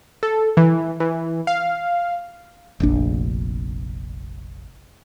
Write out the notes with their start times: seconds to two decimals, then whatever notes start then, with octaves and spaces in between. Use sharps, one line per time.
0.23 A4
0.57 E3
1.00 E3
1.47 F5
2.80 F1 A#1 D4